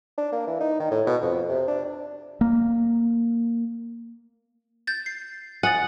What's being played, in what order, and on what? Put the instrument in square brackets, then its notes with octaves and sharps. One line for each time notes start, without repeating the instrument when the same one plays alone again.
[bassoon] D4
A#3
E3
D#4
D#3
A2
B2
F2
C3
D4
[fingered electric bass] A#3
[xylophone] G6 A6
C7
[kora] F#5 [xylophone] G#5 D#6 A6